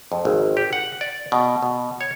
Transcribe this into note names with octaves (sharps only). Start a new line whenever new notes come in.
F2
G#1
G4
F#5
D5
B2
B2
C#5